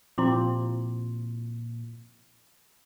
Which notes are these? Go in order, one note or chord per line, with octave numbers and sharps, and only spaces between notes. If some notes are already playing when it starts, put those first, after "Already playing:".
A#2 F3 C4 E4 C6 D6